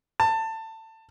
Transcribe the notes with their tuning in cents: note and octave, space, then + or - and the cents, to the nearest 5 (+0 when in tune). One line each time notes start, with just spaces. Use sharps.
A5 +20